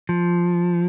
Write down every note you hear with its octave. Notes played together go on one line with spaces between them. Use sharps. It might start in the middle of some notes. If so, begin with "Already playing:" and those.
F3